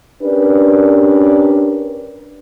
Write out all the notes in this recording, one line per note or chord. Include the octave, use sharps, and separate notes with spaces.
C#4 D4 G4 A#4 B4 D5